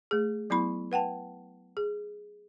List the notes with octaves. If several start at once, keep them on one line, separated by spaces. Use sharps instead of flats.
A3 G#4
F#3 B3 E4 B5 C#6
B4 F#5 G5 A5
G#4